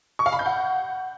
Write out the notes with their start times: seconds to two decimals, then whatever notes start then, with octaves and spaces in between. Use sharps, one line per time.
0.19 C#6
0.26 F5
0.33 B5
0.39 G6
0.46 F#5